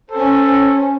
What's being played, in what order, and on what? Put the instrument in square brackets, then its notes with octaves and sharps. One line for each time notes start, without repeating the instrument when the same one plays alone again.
[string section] C#4 C5 [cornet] A4